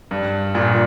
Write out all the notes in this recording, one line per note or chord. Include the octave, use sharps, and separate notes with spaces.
G2
A#1 A#2